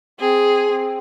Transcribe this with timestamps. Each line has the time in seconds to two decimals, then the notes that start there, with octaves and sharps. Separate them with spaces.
0.19 C4 G#4
0.68 C4